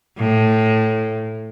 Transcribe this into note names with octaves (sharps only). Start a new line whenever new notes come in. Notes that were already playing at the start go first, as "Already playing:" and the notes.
A2